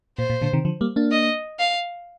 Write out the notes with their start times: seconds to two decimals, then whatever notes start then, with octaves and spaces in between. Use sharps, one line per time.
0.18 A#2 C5
0.30 A#2
0.42 A#2 D3
0.53 C3 D#3
0.65 D3 F3
0.81 G3 A#3
0.96 A#3 D4
1.12 D#5
1.59 F5